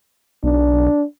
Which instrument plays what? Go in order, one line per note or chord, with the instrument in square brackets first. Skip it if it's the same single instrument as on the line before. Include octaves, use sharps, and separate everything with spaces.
[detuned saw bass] B1 [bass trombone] D4